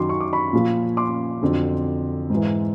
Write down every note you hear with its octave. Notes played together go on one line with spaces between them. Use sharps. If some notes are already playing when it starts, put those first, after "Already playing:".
Already playing: F#2 D#3 F#3 C6 D6
C#6
D6
B5 C#6
A#2 F3
C6 D6
F2 D3 F#3
G#2 E3